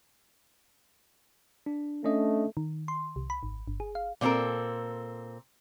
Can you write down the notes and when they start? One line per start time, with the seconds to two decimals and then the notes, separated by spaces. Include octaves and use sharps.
1.66 D4
2.04 A3 C#4 D4 D#5
2.57 D#3
2.88 C6
3.16 C2
3.30 B5
3.43 G#1
3.68 G1
3.80 G#4
3.95 F5
4.21 A#2 C4 D#4 A4 A#4